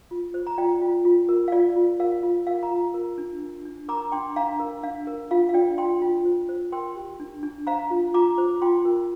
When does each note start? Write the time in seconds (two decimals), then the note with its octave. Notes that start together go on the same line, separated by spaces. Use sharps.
0.11 F4
0.34 C5
0.47 A#5
0.58 F4 D5 G5
0.82 F4
1.05 F4
1.29 A#4
1.48 F5
1.52 F4 D5
1.76 F4
2.00 A#4 F5
2.23 F4
2.47 A#4 F5
2.63 F5 A#5
2.70 F4
2.94 A#4
3.18 D4
3.42 D4
3.65 D4
3.88 A#4 A#5 D6
4.12 D4 G5 C6
4.36 D4 F5 A#5
4.60 A#4
4.83 D4 F5
5.07 A#4
5.31 F4 F5
5.49 F5
5.54 D4 D5 G5
5.78 F4 G5 C6
6.02 F4
6.25 C5
6.49 C5
6.72 A#4 G5 C6
6.96 G4
7.20 D4
7.43 D4
7.67 C5 F5 A#5
7.90 F4
8.14 F4 A#5 D6
8.38 C5
8.62 F4 G5 C6
8.85 A#4